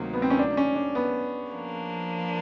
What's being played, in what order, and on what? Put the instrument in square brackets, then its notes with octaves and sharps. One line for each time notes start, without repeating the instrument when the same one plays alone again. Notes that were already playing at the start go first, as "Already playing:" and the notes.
Already playing: [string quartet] D2 C3 D#3 F#3 A#3
[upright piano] B3
C4
C#4
D4
C#4
D4
B3
[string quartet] F3 A#3 D4